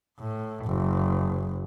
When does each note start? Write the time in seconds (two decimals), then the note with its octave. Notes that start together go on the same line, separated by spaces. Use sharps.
0.19 A2
0.65 F#1